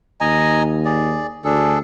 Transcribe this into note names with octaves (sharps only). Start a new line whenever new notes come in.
D#2 D#5 G#5 A#5
G#4 D5
D2 D4 G#4 A4